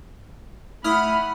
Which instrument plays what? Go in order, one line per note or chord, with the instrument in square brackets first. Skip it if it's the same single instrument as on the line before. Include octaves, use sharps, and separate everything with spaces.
[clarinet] A3 [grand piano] E4 [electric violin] F#5 B5 [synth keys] D#6 F6